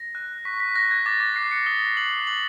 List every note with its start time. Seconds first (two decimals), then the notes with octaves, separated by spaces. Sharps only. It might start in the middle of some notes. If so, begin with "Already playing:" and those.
Already playing: A#6
0.15 F#6
0.45 C#6 B6
0.60 B6
0.76 F#6 A#6
0.91 G#6
1.06 D6 A6
1.21 A#6
1.36 F#6 C7
1.51 C#7
1.66 D#6 G7
1.97 F#6 F#7
2.27 D6 F#7